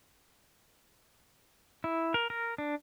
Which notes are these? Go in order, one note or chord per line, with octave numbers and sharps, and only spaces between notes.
E4
A#4
A#4
D4